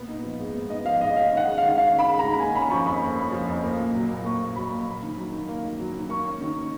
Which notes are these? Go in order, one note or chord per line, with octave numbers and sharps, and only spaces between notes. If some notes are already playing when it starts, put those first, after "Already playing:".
Already playing: A#2 B3
D#4
F3
G#2
B3
D#4 D#5
F3 F5
G#2 D#5
C#4 F5
D#3
F#5
G#3
D#3 F5
C#4 F5
D#3
B5
G#3
D#3 A#5
A#3 G#5
C#4 B5
F3 C#6
F2 B5
A#3
C#4
F3
F2
A#3
A#2
F#3
A#2
A#3 C#6
A#2
F#3 B5
A#2
A#3
D#3
F#3
D#3
A#3
D#3
F#3
D#3
A#3 C#6
C#4
D#3